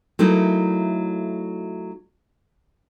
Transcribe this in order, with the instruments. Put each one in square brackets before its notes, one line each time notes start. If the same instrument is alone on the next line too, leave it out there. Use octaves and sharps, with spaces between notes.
[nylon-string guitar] F#3 A3 A#3 D#4 E4